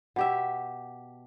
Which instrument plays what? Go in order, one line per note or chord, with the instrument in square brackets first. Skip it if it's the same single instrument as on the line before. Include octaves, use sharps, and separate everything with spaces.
[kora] B2 G4 E5